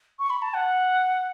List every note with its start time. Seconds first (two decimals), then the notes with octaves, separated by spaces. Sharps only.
0.19 C#6
0.30 B5
0.42 A5
0.54 F#5